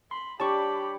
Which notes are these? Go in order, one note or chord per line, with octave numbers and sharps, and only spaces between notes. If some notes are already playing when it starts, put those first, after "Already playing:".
B5 C6
G3 D4 G4 C#5 A5 B5 C#6 D6